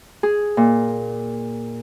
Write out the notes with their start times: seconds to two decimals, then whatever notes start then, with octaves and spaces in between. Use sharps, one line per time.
0.23 G#4
0.57 A#2